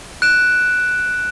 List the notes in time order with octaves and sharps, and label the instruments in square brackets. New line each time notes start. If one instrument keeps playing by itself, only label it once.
[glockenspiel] F#6 D7 E7